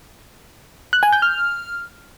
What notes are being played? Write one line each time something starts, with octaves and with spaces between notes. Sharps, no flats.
F#6
G#5
G6
F6